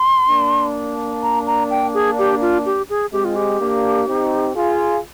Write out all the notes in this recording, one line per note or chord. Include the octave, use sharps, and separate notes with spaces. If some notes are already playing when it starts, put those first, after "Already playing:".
Already playing: C6
A#3 D4
A#5
A#5
G5
G#4
G4
F4
G4
G#4
G#3 C4 G4
F4
G4
A#3 D4
C4 D#4
F4 G#4